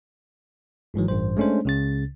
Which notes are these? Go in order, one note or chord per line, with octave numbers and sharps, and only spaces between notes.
G#1 G#2 E3 F#3
A1 G2 C5
G#3 A3 C#4 D4 C5
C#2 C#3 A6